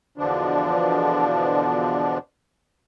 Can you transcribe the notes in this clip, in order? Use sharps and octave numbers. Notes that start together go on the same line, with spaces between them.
E2 B2 D3 F3 D4